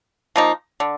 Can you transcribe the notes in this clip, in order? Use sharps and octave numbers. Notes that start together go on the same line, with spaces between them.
F3 A#3 D#4
D3